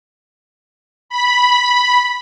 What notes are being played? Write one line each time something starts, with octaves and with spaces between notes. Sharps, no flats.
B5